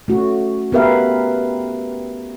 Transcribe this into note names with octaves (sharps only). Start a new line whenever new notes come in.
A3 C#4 F#4
B3 G4 A#4 B4 E5 F5